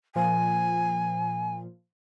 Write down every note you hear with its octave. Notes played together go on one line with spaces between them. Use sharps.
A#2 F3 G#5